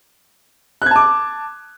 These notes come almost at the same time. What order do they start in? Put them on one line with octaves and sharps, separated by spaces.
F#6 G#6 A5 D6